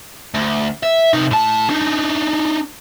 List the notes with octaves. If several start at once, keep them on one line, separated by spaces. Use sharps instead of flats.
D2
E5
C3 D#4
A2 A5
D4 D#4